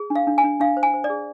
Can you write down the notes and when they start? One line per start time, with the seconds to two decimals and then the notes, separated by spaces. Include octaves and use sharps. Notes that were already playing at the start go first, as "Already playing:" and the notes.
Already playing: G#4
0.10 D4
0.15 F5
0.27 D4
0.38 G#5
0.44 D4
0.60 D4 F5
0.77 C5
0.83 G#5
0.94 C5
1.04 D5
1.10 G#4